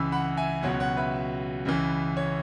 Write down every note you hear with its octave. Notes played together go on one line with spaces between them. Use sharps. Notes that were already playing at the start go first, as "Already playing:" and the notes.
Already playing: C#2 C#3 E3 B5 E6
F#5 B5
E5 G#5
C#2 B2 F#3 C#5 F#5
C#5 F#5
B4 E5
C#2 C#3 E3
C#5